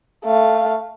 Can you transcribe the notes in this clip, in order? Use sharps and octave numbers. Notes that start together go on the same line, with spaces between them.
A3 F5